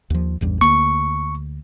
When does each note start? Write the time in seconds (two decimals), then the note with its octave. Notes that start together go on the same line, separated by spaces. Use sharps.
0.10 D#2 F3
0.41 A1 E2 G2
0.61 D2 A#3 C#6